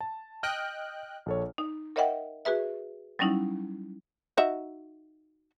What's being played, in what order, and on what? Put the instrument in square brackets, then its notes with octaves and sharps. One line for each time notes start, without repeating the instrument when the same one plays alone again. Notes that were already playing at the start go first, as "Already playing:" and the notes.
[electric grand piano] A5
[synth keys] D#5 G5 F#6 [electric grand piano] F6
[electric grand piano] A#1 A4 C#5
[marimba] D#4
A#4 C#5 D#5 E5 F#5 G5
F#4 G#4 B4 E5
F#3 G3 C#4 D#4 E4
[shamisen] D#4 F#4 E5